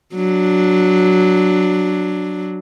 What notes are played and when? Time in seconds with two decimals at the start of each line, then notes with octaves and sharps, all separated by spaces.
0.15 F#3 D4